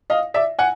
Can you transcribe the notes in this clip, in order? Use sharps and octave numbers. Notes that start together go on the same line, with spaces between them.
D#5 F5
D5 E5
F#5 G#5